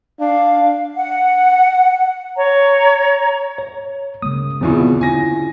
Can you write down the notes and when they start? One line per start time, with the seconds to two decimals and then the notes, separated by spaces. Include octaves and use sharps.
0.20 D4 F5
0.96 F#5
2.36 C#5 A#5
3.58 C#5
4.22 C#3 G#3 A#3 D#6
4.61 E1 E2 B2 D3 C4 E4 F4
5.01 C#4 D4 F4 G#5 A#6